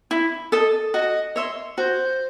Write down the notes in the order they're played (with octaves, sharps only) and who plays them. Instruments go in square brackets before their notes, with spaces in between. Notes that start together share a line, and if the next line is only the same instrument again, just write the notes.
[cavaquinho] E4
A4 D#5
[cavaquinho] F#4 [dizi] D#5
[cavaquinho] C#5 E5 C6
[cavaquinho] F#4 [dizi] C5